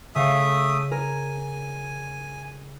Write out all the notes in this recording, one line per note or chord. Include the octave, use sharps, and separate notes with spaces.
C#3 A3 E5 F5 D#6 C#7
A#4 G#5